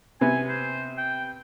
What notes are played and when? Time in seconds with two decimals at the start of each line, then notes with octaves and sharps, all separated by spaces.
0.21 C3 B3 G#5
0.48 C5
0.97 G5